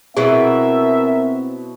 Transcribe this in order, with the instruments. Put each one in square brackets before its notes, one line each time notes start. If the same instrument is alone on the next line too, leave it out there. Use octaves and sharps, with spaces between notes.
[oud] B2 F#3 E4 [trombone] C4 [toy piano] G#4 [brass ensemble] A#4 E5